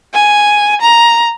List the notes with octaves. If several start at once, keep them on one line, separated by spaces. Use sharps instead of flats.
G#5
A#5